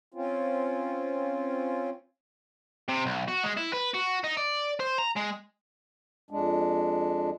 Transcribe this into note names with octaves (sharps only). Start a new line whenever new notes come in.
C4 C#4 F4
C3
B1
F#4
G#3
E4
B4
F#4
D#4
D5
C5
A#5
G#3
F2 G#3 D4